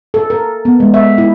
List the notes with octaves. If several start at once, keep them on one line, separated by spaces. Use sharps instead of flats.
A4
A#4
B3
G#3
E5
E4